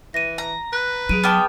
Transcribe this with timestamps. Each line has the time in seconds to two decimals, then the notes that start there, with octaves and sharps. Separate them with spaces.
0.14 E3 A#6 D#7
0.38 A#5
0.73 B4 F#6
1.09 F#3 G#4 D7 D#7
1.24 B3 G5 A5 D6 F6